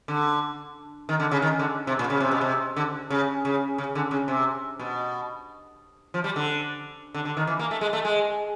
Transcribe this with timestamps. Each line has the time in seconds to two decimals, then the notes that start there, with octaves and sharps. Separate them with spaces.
0.08 D3
1.09 D#3
1.20 D3
1.31 C#3
1.42 D#3
1.59 D3
1.87 C3
1.99 A#2
2.10 C#3
2.20 C3
2.31 B2
2.41 C3
2.76 D3
3.10 C#3
3.45 C#3
3.78 C#3
3.95 D3
4.11 C#3
4.28 C3
4.80 B2
6.14 F3
6.24 G3
6.36 D3
7.14 D3
7.25 D3
7.37 D#3
7.47 E3
7.59 A#3
7.71 A3
7.81 G#3
7.93 A3
8.05 G#3